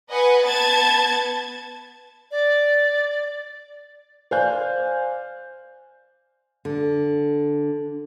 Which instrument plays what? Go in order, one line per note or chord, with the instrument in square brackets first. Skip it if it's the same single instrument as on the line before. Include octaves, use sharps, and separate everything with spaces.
[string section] B4 D#5 F#5 G#5
B3 B4 A5 G#6 A6
[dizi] D5
[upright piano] C5 D5 F5 G#5 F#6 G6
[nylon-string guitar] D3